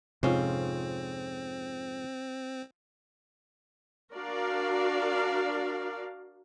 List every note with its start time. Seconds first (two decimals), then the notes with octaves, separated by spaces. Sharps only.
0.23 F2 G#2 C3 C4 C#4 F4 C5
4.14 D4 F#4 A#4 D5 F5